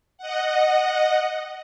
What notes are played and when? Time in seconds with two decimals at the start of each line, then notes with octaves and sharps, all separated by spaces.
0.18 D#5 F#5